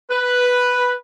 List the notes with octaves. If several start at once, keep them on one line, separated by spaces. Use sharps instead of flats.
B4